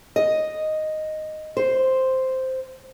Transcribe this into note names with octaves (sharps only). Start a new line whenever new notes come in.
D#5
C5